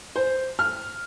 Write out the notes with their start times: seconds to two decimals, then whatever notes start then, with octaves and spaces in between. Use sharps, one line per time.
0.16 C5
0.59 F6